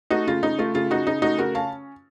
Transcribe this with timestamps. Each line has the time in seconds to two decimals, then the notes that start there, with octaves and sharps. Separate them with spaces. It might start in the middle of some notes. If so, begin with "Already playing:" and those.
0.10 A3 D#4 F#4
0.27 C#3 F4
0.43 C#3 D#4
0.59 A3 F4
0.75 C#3 F4
0.90 C#3 D#4 F#4
1.06 C#3 D#4
1.22 A3 D#4 F#4
1.38 C#3 F#4 A#4
1.55 C#4 F5 A5